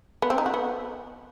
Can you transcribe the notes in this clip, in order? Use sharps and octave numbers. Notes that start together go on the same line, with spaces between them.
B3
C4
D#4
F#4
B3